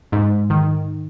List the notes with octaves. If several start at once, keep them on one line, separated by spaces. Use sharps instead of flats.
G#2
D#3